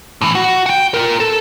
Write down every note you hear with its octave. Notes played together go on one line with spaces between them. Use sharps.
A2 E3
F#4
F#5 G5
F4 A#4
A4